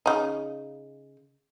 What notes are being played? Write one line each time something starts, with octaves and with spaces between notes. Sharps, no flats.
C#3 D#4